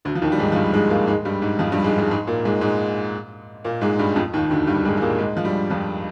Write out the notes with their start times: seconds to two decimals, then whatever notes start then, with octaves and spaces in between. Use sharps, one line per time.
0.05 D2 D3
0.15 F3
0.22 D#2 D#3
0.32 G3
0.39 G#2 G#3
0.52 F3
0.56 G2 G3
0.73 G#2 G#3
0.90 A#2 A#3
1.07 G#2 G#3
1.25 G2 G3
1.42 G#2
1.59 F2 F3
1.72 G2 G3
1.84 G#2 G#3
1.98 G#2 G#3
2.11 G#2 G#3
2.27 A#2 A#3
2.45 G#2 G#3
2.61 G#2 G#3
3.64 A#2 A#3
3.81 G#2 G#3
3.99 G2 G3
4.16 F2 F3
4.33 D#2 D#3
4.50 D2 D3
4.67 G2 G3
4.85 G#2 G#3
4.97 G#3
5.01 A#2 A#3
5.18 G#2 G#3
5.37 F3
5.44 G2 G3
5.70 F2 F3